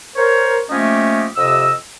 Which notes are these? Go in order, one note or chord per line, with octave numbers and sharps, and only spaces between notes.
A#4 C5 C#5
F3 A3 A#3 C#4 G4 D#5
F2 C3 D#5 E6